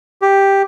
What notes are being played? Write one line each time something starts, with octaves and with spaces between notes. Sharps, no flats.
G4